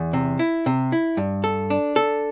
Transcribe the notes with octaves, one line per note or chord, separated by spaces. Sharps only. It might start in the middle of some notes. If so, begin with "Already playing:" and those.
Already playing: E2
C3
E4
C3
E4
G2
A4
D4
A4